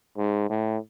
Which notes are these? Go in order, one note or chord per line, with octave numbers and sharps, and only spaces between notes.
G#2
A2